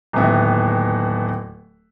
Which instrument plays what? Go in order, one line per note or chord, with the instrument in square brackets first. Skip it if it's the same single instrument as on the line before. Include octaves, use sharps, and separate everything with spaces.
[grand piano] D1 D#2 B3 E5